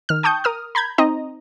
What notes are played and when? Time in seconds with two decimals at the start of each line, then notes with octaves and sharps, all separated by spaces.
0.09 D#3 F6
0.23 G5 A5 C#6 D#6 G6
0.44 A#4 D#6 F6
0.75 A#5 B5 G6 G#6
0.98 C4 D#4 D#5 A#5